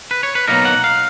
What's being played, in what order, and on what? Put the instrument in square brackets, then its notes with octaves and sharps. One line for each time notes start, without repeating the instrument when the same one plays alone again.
[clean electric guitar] B4
C#5
B4
B2 F#3 A#3 D#4 A#4
F#5
F5